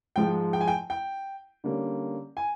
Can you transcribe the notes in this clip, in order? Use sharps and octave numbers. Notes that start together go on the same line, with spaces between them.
G#2 F3 G#3 G5
G5
G#5
G5
G5
D3 G3 A#3 C#4
G#5